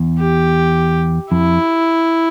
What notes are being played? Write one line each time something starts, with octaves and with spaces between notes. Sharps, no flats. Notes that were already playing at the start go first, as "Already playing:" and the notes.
Already playing: E2
G4
F2 E4